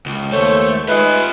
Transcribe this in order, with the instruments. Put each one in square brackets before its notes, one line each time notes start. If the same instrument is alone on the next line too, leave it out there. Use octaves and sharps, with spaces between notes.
[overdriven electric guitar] C#2
[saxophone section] D#2 C5 C#5 [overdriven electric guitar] A3
[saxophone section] G#3 D#4 B4 [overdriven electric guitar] F4 E5